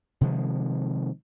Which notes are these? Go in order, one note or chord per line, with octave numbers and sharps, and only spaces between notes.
C3 D#3 F3 G#3